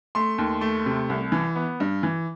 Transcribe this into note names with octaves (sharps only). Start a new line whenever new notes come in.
A3 C6
D#2
A3
C3
C2
E3
B3
G2
E3